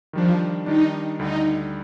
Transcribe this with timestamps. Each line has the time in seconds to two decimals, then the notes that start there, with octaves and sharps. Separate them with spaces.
0.13 D#3 F3 G3 D4
0.66 D#3 G3 D4 D#4
1.19 D2 D3 G3 D#4